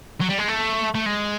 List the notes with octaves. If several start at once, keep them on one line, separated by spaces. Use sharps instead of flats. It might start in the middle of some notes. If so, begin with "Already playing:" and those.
F#3
G3
G#3
A3
A3
G#3